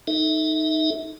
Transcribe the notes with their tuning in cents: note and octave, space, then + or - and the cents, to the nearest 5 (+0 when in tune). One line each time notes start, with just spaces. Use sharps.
D#4 +0 A4 +0 E5 -25